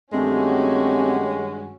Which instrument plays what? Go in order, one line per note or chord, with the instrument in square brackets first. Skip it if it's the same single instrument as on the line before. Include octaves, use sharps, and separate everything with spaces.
[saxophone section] G2 D#3 G#3 [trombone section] A3 G4 [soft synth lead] C4 [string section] C#4 F#4